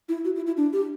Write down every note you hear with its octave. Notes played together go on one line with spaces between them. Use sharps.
E4
F#4
E4
E4
D4
G4